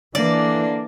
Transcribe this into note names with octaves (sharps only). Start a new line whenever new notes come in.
D3 E3 A#3 D4 D5